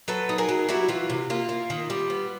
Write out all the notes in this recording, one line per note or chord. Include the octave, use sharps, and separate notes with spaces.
F#3 A4 B4
D#4
G#4 A#4
F#3
G3 E4 F#4
E3 F4
C3
A#3 F4
A#3
D#3
G3
B3